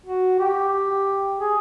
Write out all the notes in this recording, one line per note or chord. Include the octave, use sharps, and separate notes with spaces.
F#4
G4
G#4